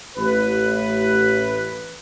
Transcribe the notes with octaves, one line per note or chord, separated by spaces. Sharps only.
A1 B4